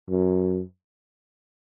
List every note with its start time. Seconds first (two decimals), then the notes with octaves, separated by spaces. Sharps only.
0.09 F#2